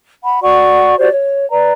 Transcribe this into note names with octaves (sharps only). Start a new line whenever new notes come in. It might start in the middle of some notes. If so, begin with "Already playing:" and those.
F#5 B5
F#4 D5 F#5 C#6
F#4 G4 C5 D5
C#5
B4 D5 A#5